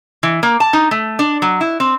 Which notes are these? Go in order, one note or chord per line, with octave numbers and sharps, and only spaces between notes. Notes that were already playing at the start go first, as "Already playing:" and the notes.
E3
A#3
A5
D#4
A3
D4
F#3
E4
C4